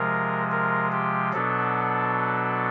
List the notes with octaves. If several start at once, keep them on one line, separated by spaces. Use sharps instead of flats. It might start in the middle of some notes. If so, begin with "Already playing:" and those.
Already playing: C3 F3 G#3 A#4
A#4
G4
B2 F#3 B3 D4 A4